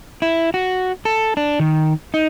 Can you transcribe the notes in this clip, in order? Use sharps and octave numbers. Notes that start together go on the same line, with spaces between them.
E4
F#4
A4
D4
D#3
D#4